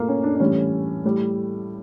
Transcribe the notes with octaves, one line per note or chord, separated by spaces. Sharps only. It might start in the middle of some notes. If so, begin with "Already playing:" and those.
Already playing: A#2 A3 A#3
C#4
D4
D4
A2 E3 G3 C#4
A2 G3